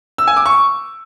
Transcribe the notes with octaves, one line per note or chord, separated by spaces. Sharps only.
E6
G#5
D6
C#6